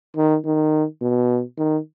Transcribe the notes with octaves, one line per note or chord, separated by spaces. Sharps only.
D#3
D#3
B2
D#3